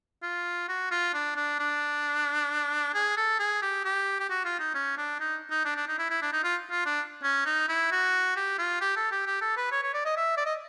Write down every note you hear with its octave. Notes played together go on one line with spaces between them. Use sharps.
F4
F#4
F4
D4
D4
D4
G#4
A4
G#4
G4
G4
G4
F#4
F4
D#4
C#4
D4
D#4
D#4
D4
D4
D#4
E4
E4
D4
D#4
F4
F4
D4
C#4
D#4
E4
F#4
G4
F4
G4
A4
G4
G4
A4
B4
C#5
C#5
D5
D#5
E5
D5
D#5